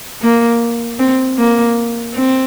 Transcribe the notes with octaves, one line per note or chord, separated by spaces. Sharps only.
A#3
C4
A#3
C4